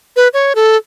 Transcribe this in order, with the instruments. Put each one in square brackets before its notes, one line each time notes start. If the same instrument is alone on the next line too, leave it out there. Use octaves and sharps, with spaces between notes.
[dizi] B4
C#5
A4